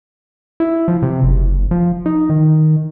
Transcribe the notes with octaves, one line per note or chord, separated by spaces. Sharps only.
E4
F3
C3
F#1
F3
D#4
D#3